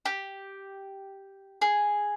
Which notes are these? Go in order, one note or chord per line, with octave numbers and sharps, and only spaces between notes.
G4
G#4